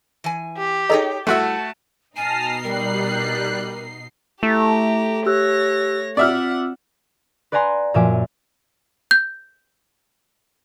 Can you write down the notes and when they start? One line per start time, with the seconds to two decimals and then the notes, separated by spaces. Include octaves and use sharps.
0.24 E3 G#5
0.57 G4
0.90 D#4 G#4 A4 C#5 D#5 A#5
1.27 G3 A3 E4 F#4 E5 A5
2.16 B2 D#4 G#5 A5 F6 A#6 C7
2.64 G3 A#4 F#6
4.43 A3 E4 G4 A#5
5.26 G4 C#5 E6 F#6 A#6
6.17 C4 F4 D5 E5 F#5 F6
7.52 B4 D5 F#5 G#5 A#5 C6
7.94 F#2 A#2 F3 E5 G#5 D6
9.11 G6